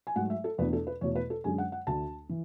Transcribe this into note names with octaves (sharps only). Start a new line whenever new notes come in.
G#5
G#2 F#3 A3 F#5
E5
A4
E2 B2 A3 D4 B4
A4
B4
E2 B2 A3 C#5
B4
A4
F#2 D3 G#3 C#4 G#5
F#5
F#5
D2 D3 A3 D4 A5
E3